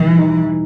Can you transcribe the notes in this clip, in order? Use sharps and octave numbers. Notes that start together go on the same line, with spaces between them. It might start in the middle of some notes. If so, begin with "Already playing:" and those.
Already playing: B2 E3 G3 D#4
D#4